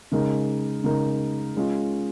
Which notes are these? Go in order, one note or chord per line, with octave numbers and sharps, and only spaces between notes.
C#3 G#3 D#4 A#4
C#3 G#3 D#4 A#4
G#3 C#4 F4